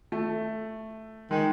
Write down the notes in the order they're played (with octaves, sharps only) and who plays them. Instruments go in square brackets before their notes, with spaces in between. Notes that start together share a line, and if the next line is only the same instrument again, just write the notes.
[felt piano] A3
[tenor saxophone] D#3 [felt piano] G#3